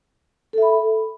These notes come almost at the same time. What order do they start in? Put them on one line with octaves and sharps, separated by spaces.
A4 E5 B5